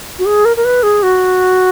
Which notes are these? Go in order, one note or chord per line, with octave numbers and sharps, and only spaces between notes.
F#4
G#4
A#4
A#4
B4
G#4
F#4